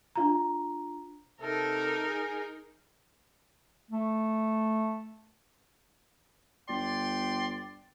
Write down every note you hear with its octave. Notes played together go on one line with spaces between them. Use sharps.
D4 F4 A#5
C3 D#4 A4 A#4
G#4
A3
G1 D5 G5 C6